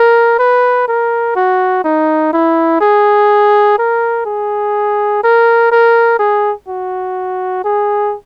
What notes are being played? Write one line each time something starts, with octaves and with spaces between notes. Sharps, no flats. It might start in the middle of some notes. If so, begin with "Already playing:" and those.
Already playing: A#4
B4
A#4
F#4
D#4
E4
G#4
A#4
G#4
A#4
A#4
G#4
F#4
G#4